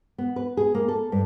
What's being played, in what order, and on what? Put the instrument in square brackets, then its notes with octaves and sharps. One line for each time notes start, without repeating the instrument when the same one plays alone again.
[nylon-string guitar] B3
B4
G#4
A#3
A4
G2